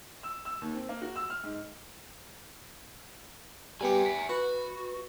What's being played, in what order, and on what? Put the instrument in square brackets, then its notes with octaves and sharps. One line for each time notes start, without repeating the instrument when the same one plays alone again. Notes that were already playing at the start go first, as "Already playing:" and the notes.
[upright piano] E6
E6
D#2
C4
A#3
F#4
E6
F6
G#2
[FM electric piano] G3 B3 G4 [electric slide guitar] E5 F#5 G#5
[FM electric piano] B6
[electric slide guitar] F#4 [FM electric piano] B4